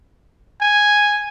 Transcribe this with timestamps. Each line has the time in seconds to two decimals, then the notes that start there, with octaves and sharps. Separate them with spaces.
0.61 G#5